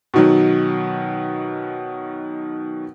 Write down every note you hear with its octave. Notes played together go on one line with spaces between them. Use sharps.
B2 D#3 F#3